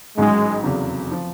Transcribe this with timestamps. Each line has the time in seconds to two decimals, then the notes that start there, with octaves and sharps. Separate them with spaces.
0.18 A1 G#2 D#3 F#3 G#3
0.63 F1 E2 C#3 F#3
1.11 F3